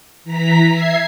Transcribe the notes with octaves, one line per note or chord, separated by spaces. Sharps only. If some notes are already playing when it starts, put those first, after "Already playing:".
E3 A#5 B6
E5 G#6 C7